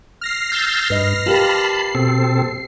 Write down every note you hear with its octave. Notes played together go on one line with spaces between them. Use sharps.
F6 A#6 C7
E6 G6 A6
G2 B4 D#5
F4 G4 A#4 A5 B5
C7
B2 C4 A4